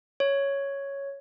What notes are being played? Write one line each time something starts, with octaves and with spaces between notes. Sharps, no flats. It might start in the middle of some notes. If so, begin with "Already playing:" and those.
C#5